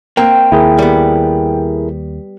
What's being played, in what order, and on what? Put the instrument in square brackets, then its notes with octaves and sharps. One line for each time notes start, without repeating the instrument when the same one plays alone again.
[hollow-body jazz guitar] A#3 C4 [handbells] G5
[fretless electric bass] D#2 [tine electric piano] E4 G#4 A#4
[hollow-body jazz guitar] G3 B3